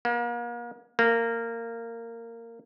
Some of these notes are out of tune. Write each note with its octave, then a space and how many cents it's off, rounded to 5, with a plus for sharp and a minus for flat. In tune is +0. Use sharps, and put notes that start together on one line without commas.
A#3 +40
A#3 -15